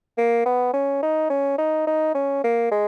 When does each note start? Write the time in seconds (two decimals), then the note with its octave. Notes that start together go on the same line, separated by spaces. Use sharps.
0.18 A#3
0.46 B3
0.73 C#4
1.02 D#4
1.30 C#4
1.58 D#4
1.87 D#4
2.15 C#4
2.44 A#3
2.71 G#3